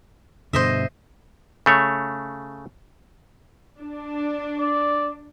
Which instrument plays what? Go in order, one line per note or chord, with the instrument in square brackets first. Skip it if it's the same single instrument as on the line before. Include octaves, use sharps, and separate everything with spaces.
[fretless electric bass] G2 B2 D3 [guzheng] C5 D#5 E5
[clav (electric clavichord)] C#3 A3 C#5
[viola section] D4
[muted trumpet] D5